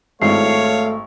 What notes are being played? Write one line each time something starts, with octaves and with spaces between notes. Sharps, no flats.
G#1 A3 E4 C#5 F5 C7
C#6